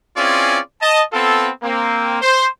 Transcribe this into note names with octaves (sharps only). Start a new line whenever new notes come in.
C4 C#4 E4 F4 G#4 D5
D#5 A5
B3 C4 F4 A4
A#3 C4
C5